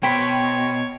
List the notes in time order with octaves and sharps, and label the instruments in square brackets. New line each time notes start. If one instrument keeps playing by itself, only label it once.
[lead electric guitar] B2 [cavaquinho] C5 B5 [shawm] C#5 [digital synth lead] G5